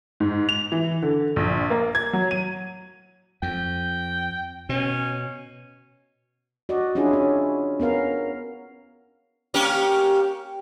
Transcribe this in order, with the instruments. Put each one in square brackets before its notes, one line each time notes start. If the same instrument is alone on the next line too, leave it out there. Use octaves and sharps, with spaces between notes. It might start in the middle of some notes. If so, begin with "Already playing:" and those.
[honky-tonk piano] G#2
F7
E3
D3
A#1
A#3
G#6
F#3
D#7
[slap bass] F2 [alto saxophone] G5
[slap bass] B2 [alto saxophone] C#4
[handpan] F#4 D5 D#5
C#4 D4 E4 F4 G#4
C#4
B3 C#4 A#4 F5
[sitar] A#3 C#4 G4